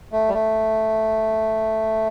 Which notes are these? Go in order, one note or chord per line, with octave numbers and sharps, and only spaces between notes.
A3
G3
A3